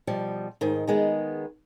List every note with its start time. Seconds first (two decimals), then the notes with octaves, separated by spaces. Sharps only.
0.07 B2 F3 G3
0.61 G#2 D#3
0.88 D#3 G#3 B3